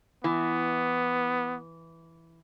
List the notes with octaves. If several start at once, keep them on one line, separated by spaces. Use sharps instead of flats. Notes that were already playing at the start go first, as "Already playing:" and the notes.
E3 B3